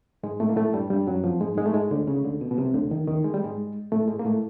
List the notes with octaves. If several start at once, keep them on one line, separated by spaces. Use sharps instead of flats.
G#2 G#3
A2 A3
A#3
A2 A3
G2 G3
G2 G3
F#2 F#3
F2 F3
G#2 G#3
G#2 G#3
A3
G#2 G#3
D2 D3
C#2 C#3
D2 D3
B2
B2
C2 C3
D2 D3
D#2 D#3
D#2 D#3
G#3
G3
G#2 G#3
A2 A3
G#2 G#3
A#3
A2 A3